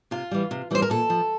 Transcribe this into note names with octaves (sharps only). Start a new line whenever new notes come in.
C3 F4
E3 G3
C3
E3 G3 C5
A#4
A#2 A4
F3